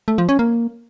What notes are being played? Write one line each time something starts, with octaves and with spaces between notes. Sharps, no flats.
A3
F3
C#4
A#3